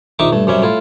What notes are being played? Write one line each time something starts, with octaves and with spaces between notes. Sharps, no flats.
A#1 D#3 D#4 E5 C#6 D6
G2 A3
F#2 C3 G3 C#4 E5
A2 E4 F4